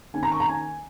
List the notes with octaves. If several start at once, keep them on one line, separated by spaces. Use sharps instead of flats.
D#3 A#3 C#4 G#5
A#5
C#6
A#5
G#5